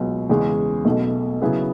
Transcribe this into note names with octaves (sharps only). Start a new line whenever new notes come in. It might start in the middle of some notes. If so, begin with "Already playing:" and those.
Already playing: C#2 B2 F#3
E2 C#3 G#3 C#4 G#4
B1 B2 A3
C#3 F#3 B3 E4 G#4